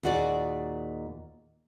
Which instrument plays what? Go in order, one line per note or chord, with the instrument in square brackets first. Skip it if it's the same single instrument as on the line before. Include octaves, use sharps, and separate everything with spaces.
[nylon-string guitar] D#2 A#2 F#4 G#4 D5